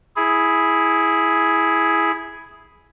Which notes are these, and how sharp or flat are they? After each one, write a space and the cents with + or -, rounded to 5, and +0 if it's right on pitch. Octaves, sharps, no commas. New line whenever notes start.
E4 -5 G#4 +5